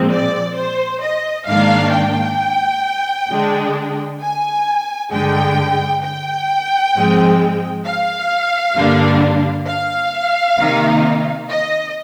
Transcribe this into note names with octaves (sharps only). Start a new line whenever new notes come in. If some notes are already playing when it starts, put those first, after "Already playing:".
Already playing: A#2 F3 G#3 C4
D5
C5
D#5
G#2 D#3 A#3 D4 F5
G5
D3 G#3 D4
G#5
G2 D3 G#3 G5
G5
G#2 F3 G#3 C4
F5
G2 D3 G3 A#3 D4
F5
C3 D#3 A#3 D#4
D#5